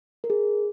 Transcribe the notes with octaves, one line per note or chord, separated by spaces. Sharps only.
A#4
G#4